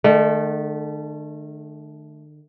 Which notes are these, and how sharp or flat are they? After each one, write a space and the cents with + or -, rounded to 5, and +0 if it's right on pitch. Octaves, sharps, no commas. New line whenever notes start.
D3 +45 A3 -20